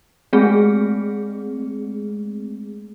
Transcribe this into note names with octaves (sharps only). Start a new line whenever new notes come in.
G#3 A3 C4 G#4